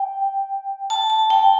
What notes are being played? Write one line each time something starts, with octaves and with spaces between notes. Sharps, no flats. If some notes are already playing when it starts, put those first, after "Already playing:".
Already playing: G5
A5
A5
G5